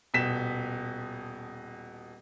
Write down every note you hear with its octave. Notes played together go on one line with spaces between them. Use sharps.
D#1 B2 B6 E7